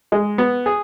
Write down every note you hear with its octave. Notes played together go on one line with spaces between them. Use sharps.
G#3
B3
G#4